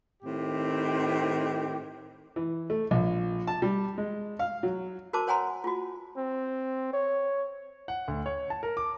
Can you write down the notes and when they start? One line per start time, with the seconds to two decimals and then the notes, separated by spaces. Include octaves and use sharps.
0.23 A2 D#3 C4 G4
2.36 E3
2.70 A3
2.91 A#1
3.47 A5
3.62 G3
3.98 G#3
4.39 F5
4.63 F#3
5.13 F#4 A#4 C5 A5 D6
5.27 C5 C#5 F#5 G#5 A#5 C6
5.64 F4 F#4
6.17 C4
6.93 C#5
7.88 F#5
8.08 D2
8.26 C#5
8.50 A5
8.63 A#4
8.77 D6